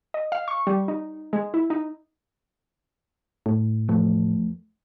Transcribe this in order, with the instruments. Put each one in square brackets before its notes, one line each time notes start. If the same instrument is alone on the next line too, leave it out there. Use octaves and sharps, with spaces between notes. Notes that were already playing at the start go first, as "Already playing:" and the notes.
[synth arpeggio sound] D#5
F5
C#6
G3
D#4
G#3
E4
D#4
[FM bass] A2
[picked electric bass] E2 F3 A3